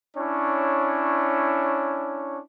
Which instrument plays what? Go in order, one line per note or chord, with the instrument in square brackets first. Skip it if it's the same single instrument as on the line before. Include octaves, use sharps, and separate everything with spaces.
[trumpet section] C#4 D4 E4 C#5